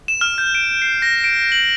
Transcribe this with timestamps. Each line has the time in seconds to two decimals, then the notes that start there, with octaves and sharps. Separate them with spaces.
0.08 E7
0.21 F6
0.38 G6
0.55 D7
0.82 C7
1.02 A#6
1.24 D7
1.52 F#7